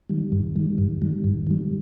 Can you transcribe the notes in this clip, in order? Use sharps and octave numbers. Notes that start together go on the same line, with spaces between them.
D#3 G3
G2
D#3 G3
G2
D#3 G3
G2
D#3 G3